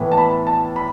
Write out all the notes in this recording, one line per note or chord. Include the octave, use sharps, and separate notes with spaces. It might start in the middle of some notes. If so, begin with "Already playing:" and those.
Already playing: A2 E3 B3
A5
B5
A5
B5